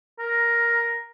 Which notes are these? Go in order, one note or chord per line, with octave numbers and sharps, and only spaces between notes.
A#4